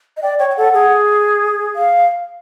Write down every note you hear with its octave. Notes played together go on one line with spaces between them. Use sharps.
D#5
D5 G5
C#5 G5
G5
A4 F#5
G#4
F5